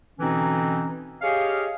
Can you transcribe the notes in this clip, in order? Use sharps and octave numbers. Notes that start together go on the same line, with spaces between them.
B2 D3 E3 C4 C#4 D#4
G4 G#4 C#5 D#5 F5